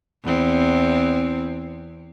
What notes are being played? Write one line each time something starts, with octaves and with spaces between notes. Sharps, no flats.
E2 C4